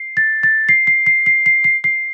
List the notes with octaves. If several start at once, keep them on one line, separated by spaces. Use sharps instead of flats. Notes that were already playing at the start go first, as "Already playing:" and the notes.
Already playing: C7
A6
A6
C7
C7
C7
C7
C7
C7
C7